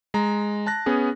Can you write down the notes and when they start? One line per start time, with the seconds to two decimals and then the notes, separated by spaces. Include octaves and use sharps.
0.14 G#3 A#5
0.66 A5 F#6 A#6
0.86 B3 C#4 G#4